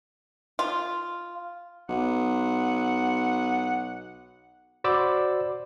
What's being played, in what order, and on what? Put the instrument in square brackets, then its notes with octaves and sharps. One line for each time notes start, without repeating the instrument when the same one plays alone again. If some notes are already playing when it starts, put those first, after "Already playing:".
[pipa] F4
[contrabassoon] B1 [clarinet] F#5
[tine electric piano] F#4 C5 D5 B5 D6 E6